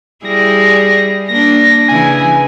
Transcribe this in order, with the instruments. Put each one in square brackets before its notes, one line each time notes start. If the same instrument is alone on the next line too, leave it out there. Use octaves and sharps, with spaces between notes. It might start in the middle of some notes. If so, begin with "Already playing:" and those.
[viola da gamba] G3 E4 G#4 [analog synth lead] A#6
[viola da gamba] A#3 D4 [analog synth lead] A#6
[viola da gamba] C#3 E3 E4 [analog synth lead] G#5